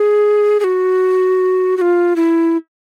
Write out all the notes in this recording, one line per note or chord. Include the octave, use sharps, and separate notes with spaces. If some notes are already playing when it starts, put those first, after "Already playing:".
Already playing: G#4
G#4
F#4
F#4
F4
E4